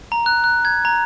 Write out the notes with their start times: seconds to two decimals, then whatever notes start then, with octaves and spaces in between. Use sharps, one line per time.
0.12 A#5
0.26 F#6
0.44 F#6
0.65 G#6
0.85 A#5